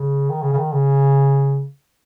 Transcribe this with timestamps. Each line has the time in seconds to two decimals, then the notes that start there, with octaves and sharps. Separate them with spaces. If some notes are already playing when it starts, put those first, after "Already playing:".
Already playing: C#3
0.30 D#3
0.42 C#3
0.53 C#3
0.57 D#3
0.73 C#3